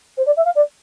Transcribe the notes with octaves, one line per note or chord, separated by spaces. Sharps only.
C5
D5
E5
F5
D5